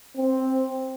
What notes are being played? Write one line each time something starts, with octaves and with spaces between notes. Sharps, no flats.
C4